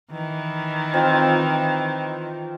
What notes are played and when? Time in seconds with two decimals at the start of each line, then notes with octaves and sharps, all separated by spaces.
0.11 D#3 E3
0.94 C4 F4 D#5